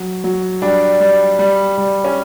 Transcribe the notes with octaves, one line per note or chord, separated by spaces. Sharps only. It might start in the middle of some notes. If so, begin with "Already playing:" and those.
Already playing: F#3
F#3
G3 D4
G3
G3
G3
C#4